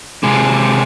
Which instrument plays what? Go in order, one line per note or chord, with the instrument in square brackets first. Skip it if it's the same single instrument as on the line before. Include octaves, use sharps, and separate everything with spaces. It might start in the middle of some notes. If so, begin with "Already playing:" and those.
[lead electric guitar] C3 G#3